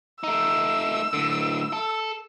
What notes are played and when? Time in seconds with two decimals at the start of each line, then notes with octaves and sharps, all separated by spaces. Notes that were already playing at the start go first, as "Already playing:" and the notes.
0.23 A3 D#4 E6
1.13 A2 D3
1.73 A4